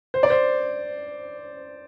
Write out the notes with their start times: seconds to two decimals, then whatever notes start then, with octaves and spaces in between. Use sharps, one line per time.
0.14 C5
0.23 D5
0.30 C5